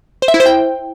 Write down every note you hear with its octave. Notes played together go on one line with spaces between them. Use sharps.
C5
E5
E4
C5
G5